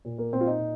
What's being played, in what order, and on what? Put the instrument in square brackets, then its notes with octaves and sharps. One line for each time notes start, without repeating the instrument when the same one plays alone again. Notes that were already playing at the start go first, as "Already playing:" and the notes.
[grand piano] A#2
A#3
A#2 C4
F4
D#4
A#2